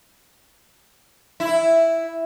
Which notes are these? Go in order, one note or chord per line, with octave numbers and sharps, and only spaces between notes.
E4